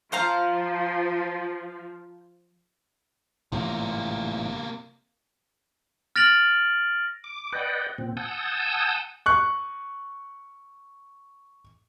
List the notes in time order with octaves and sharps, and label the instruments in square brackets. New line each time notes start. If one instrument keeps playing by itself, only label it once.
[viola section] F3 [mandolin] C5 F5 A#5
[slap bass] A1 G#2 F3 [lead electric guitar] C3 A#3
[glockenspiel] F6 A6 A#6 D7 F7 F#7
[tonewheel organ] D6
B4 D5 D#5 F#5 G5
A#2 C4
F#5 G#5 A5 D#6 E6 G6
[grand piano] C#6 F#6